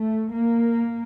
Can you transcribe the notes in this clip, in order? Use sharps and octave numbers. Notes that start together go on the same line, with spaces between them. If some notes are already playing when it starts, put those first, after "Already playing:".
Already playing: A3
A#3